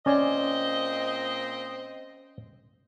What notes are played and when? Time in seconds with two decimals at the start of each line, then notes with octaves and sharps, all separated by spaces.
0.06 A#2 C4 C#4 D5 D#5 G#5